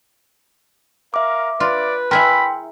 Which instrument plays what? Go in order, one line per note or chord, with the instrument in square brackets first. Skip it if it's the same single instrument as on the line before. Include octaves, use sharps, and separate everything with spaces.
[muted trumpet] A#4 [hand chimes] E5 D6 [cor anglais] F5
[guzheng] F4 [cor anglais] B4 [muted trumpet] D5
[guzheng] E4 G#4 A#4 [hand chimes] G5 C6 [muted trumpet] B5